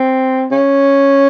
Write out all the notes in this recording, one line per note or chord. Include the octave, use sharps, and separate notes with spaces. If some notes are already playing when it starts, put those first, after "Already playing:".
Already playing: C4
C#4